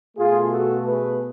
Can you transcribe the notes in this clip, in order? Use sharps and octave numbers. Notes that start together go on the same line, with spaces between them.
B2 A3 F4 G#4
F#4 A4
G#4 B4